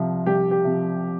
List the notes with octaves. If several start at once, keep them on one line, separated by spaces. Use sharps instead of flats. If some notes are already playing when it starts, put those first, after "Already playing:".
Already playing: C2 C3 F3
C2 G4
G4
C3 F3